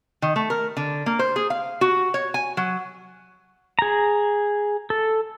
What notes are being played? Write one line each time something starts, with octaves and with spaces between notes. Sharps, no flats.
D#3
A3
A#4
D3
A#3
C5
G#4
F5
F#4
C#5
G#5
F#3
G#4 A#5
A4